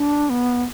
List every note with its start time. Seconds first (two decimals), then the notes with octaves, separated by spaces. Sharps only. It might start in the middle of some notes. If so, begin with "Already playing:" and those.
Already playing: D4
0.30 B3